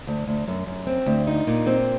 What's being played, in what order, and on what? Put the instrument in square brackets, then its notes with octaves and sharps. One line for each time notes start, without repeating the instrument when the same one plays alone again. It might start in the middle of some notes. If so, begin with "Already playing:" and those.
[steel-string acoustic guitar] D2
D2
F#2
F#2
C4
D2
D#4
A#2
C4